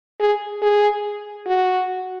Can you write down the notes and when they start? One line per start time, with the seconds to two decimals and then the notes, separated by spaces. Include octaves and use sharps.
0.20 G#4
0.62 G#4
1.46 F#4